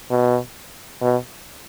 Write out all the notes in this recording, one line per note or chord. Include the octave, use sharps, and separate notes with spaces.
B2
B2